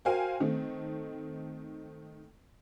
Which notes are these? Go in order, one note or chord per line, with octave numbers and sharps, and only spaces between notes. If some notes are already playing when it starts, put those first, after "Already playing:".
F#4 A#4 C5 F5 G5 G#5
D#3 A3 C4